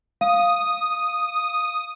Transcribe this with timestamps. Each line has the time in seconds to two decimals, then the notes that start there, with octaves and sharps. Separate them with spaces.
0.21 F5 D#6